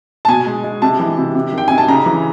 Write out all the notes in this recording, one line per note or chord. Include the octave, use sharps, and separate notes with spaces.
A5
B2 G#5
G#3
G#3
C3 A5
E3
C3
C3
D#3
G5
C3 G#5
A5
C#3 A#5
E3